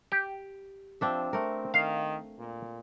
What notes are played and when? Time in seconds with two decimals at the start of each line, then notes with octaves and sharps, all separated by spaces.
0.12 G4
1.01 F3 C4 D4 E5
1.33 A3 C4 A#4
1.74 D#3 F5
2.39 A#2